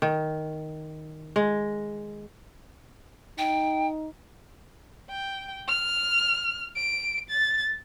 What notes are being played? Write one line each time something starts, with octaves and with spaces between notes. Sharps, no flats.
D#3
G#3
D#4 G5
G5
F6
D7
A6